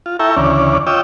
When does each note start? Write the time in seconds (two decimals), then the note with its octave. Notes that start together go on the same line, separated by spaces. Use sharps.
0.06 F4
0.19 E4 A4 E5 G5 A#5 C#6
0.36 D2 C#3 E3 C#4 D5
0.87 F4 C#5 D#5 G5 D6 E6